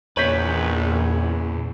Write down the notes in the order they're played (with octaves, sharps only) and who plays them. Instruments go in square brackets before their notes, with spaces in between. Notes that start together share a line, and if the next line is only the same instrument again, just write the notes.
[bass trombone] A#1 [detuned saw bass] E2 [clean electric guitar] A#2 C#3 B4 [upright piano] C#5 G6 B6